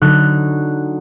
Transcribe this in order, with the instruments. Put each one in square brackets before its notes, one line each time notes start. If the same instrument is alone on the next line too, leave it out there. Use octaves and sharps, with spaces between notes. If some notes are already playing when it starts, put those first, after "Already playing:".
[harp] D3 F#3 D#4 F#6